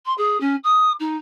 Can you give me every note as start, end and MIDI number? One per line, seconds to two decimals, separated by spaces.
0.05 0.13 84
0.17 0.39 68
0.40 0.55 61
0.63 0.92 87
0.99 1.17 63